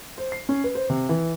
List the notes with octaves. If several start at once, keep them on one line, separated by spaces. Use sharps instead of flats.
C5
C7
C#4
B4
C5
C3
E3